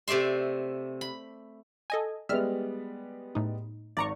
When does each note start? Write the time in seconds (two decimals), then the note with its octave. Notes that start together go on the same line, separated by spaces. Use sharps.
0.08 C3 A3 D5 E5 C6
1.01 B5
1.90 A4 D#5 G#5
2.29 G3 G#3 B3 E5 F6
3.35 A2 D#4
3.97 G#1 D5 A#5 C#6